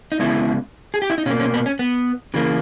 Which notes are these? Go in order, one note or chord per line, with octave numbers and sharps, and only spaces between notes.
D#4
C#3 G#3 B3 E4
G#4
G4
E4
D#4
B2 A#3 C#4
C#4
B3
C#4
B3
C#3 E3 A#3